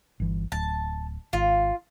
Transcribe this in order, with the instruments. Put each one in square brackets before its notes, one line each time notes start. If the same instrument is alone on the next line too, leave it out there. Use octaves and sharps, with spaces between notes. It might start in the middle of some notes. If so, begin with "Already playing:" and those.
[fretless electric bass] G1 E3
[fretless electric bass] D1 [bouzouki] A5
[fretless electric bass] G#1 [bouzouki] F4